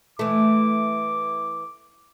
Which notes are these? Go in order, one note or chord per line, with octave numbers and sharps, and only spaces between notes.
E3 A3 D6